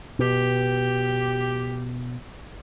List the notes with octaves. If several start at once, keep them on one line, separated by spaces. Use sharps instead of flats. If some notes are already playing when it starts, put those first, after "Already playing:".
B2 G4